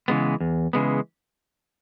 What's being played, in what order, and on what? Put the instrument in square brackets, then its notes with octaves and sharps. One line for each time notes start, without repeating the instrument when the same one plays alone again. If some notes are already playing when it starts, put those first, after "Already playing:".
[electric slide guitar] C#3 E3 G#3 B3
E2
C#3 E3 G#3 B3